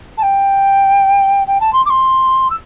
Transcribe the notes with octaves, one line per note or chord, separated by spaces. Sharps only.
A5
G5
G5
A5
C6
D6
C6
E6